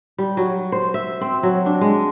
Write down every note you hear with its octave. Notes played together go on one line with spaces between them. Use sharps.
G3
F#3
C5
E5
C4
F#3
D4
G#3